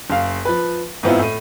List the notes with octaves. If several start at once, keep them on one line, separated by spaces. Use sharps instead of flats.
F#1 F5
F3 B4
G#2 E3 B3 C4 E4 F4
A2 D#7